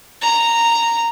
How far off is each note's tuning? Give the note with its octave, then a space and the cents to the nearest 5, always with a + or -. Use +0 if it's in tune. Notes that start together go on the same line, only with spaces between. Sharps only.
A#5 -10